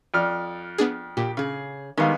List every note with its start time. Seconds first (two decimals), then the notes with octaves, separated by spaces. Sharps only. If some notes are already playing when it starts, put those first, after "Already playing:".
0.14 F2 D5 F6
0.78 B3 D4 G#4
1.17 A#2 G4
1.37 C#3 G#4
1.97 D#3 G3 G#3 B3 F5